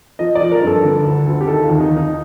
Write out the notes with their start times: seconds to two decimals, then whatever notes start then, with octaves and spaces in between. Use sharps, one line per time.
0.19 F3 D#5
0.35 D5
0.41 F3
0.52 A#4
0.62 G2 A4
0.83 D3
1.05 D2
1.27 D2
1.41 G4
1.47 D#3 A4
1.64 F4
1.69 D#2
1.80 D#4
1.91 D#2
1.97 D#4